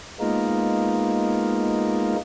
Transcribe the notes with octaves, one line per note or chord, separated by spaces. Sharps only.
G#3 A#3 B3 D#4 F4 A#4